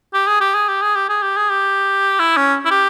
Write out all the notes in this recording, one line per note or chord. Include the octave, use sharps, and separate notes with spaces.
G4
G#4
G4
G#4
G4
G#4
G4
G#4
G4
G#4
G4
E4
C#4
E4
G4